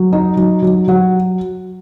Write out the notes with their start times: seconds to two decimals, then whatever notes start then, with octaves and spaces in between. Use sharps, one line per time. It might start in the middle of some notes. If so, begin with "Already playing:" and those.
Already playing: F#3
0.13 D#4
0.37 F#3
0.62 F#3
0.88 F#3 F#5